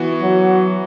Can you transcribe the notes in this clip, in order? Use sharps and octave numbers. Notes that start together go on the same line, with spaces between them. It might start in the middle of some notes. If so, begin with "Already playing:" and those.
Already playing: E3 B3 F#4
F#3